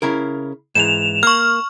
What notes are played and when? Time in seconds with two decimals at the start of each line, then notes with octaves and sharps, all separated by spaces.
0.02 C#3 E4 A#4
0.75 G#2 E3 E7 F7
1.23 A#3 C#6 F6